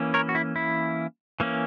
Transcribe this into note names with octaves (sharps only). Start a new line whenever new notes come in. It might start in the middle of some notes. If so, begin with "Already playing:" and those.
Already playing: E3 A#3 C#4
A#4 C#5
F#4
E4
E4
E3 A#3 C#4